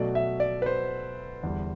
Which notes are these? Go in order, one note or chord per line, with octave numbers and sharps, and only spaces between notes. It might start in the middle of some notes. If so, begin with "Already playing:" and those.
Already playing: B2 F#3 A3 D5
E5
D5
B4
C5
E2 D3 G3